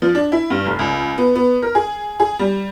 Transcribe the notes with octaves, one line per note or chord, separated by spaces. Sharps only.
F3
D4
E4
G2
F1
C#2
B3
B3
A#4
G#4
G#4
G3